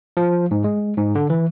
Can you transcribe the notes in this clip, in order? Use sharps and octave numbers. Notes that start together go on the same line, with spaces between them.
F3
G#2
G#3
G#2
D3
E3